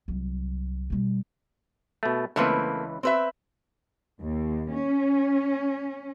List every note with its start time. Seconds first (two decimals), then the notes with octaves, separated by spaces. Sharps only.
0.08 C2 F#3
0.90 B2 G3
2.03 B2 A3
2.36 C#2 E3 A3 A#3 C4 B4
3.03 C4 B4 E5
4.22 D#2
4.71 C#4